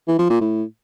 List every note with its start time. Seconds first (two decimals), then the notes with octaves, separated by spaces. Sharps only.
0.08 E3
0.19 F3
0.30 A#2
0.41 A2